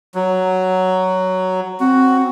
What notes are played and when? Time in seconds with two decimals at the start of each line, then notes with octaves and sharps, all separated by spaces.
0.15 F#3
1.80 C4 F#4